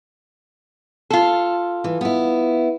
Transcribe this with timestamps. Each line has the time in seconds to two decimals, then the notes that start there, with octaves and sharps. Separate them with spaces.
1.10 F4 A4
1.84 E3
2.01 B3 E4